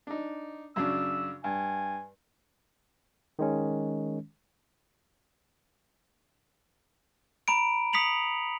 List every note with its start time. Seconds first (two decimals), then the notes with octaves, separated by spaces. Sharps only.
0.07 D4 D#4
0.76 F#2 C#3 D4 E6
1.44 G2 G#5
3.39 D#3 G#3 C#4
7.48 A#5 B5 D7
7.93 D#6 B6 C#7 F7 F#7